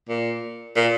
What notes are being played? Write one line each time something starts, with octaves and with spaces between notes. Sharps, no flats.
A#2
A#2